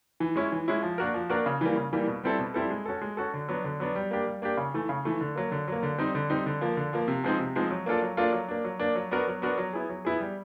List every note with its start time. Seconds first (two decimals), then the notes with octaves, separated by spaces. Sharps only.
0.20 E3
0.36 G#3 C#4 E4
0.52 E3
0.68 G#3 C#4 E4
0.82 F3
0.98 A#3 D4 F#4 A#4
1.14 F3
1.29 A#3 D4 F#4 A#4
1.46 C#3
1.61 E3 G3 A#3
1.76 C#3
1.93 E3 G3 A#3
2.07 B2
2.23 G3 C4 E4 A4
2.39 B2
2.54 G3 C4 E4 A4
2.70 G#3
2.86 C#4 F#4 A4
3.02 G#3
3.17 C#4 F#4 A4
3.34 D3
3.49 F#3 B3 D4
3.64 D3
3.80 F#3 B3 D4
3.95 G3
4.11 A#3 D4 G4
4.27 G3
4.42 A#3 D4 G4
4.57 C#3
4.74 E3 A3
4.89 C#3
5.05 E3 A3
5.21 D3
5.36 F#3 A#3
5.51 D3
5.68 F#3 A#3
5.83 D3
5.98 G3 C4 D#4
6.15 D3
6.30 G3 C4 D#4
6.46 D3
6.61 F3 A#3
6.77 D3
6.93 F3 A#3
7.08 C3
7.24 F3 G#3 C4 D#4
7.39 C3
7.56 F3 G#3 C4 D#4
7.71 F#3
7.86 A#3 D4 F4 A4
8.02 F#3
8.17 A#3 D4 F4 A4
8.33 F#3
8.48 A#3 D4
8.64 F#3
8.79 A#3 D4
8.95 F#3
9.11 B3 D4 F#4 A#4
9.27 F#3
9.42 B3 D4 F#4 A#4
9.57 F#3
9.73 B3 E4 G#4
9.89 F#3
10.05 B3 E4 G#4
10.20 G3